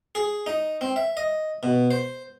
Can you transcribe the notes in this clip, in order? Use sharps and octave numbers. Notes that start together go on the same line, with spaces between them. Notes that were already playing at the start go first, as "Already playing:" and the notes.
G#4
D#4
C4
E5
D#5
B2
C5